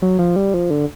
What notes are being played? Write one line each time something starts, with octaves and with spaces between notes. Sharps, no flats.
F#3
F3
G3
F3
D3